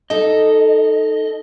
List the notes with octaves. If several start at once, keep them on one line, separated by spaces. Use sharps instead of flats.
D#4 A4 D#5